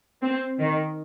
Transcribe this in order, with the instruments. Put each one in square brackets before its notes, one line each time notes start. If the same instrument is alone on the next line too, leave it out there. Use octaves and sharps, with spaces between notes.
[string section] C4
D#3